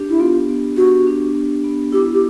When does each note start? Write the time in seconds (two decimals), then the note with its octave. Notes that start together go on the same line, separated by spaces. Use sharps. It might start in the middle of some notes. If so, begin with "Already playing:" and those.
Already playing: D4 G4
0.10 E4
0.20 B3 F4
0.49 B3
0.77 F#4 G4
1.07 D4
1.35 B3
1.64 B3
1.92 E4 G4
2.14 G4